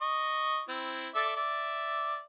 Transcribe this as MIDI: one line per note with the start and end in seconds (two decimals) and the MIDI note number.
0.02 0.62 75
0.02 0.62 85
0.69 1.08 60
0.69 1.08 64
1.15 1.35 69
1.15 1.35 74
1.15 1.35 76
1.37 2.22 74
1.37 2.22 76